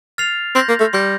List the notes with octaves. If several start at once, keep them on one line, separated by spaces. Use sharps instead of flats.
F6 A6 C7 F7
C4 C6 G6 A#6
A#3
A3
G3 C6 G6 A#6